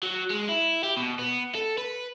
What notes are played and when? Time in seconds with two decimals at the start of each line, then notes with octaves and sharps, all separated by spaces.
0.03 F#3
0.30 G#3
0.49 E4
0.83 G4
0.97 B2
1.19 B3
1.55 A4
1.78 B4